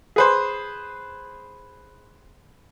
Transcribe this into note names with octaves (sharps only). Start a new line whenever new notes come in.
G#4 B4 C5